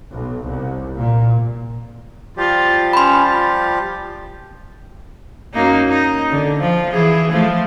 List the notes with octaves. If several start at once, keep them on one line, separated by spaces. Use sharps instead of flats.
B1
C2
A#2
F3 G3 F4 G4
C#4 B5 C6
F4
F#2 A#3 D#4
D#4
D3
F3
E3 G#4
F3 A3